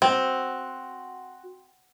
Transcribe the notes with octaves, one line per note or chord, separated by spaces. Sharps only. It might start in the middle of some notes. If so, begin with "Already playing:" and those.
C4 F#4